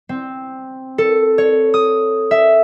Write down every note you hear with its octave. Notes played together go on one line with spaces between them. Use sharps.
C4
A4
C#5
D#6
E5